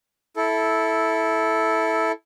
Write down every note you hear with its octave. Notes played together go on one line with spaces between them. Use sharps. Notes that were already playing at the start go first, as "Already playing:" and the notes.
E4 A4